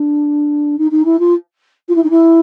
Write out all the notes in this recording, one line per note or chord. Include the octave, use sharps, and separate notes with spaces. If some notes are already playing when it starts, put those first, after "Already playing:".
Already playing: D4
D#4
D#4
E4
F4
F4
E4
D#4
E4